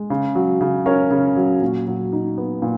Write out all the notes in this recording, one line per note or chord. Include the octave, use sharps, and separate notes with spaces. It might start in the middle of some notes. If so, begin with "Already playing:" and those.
Already playing: G#3
C#3
F#3
C#3
C#4 A#4 C#5
C#3
F#3
A#2
F#3
D#4
B3
A#2